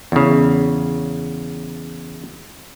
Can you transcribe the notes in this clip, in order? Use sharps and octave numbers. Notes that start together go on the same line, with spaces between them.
E2 C#3